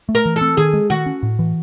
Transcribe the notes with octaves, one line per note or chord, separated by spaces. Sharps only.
A3
A#4
E3
A4
C4
D#3 G#4
G#3
D#3 F#4
C#4
A2
E3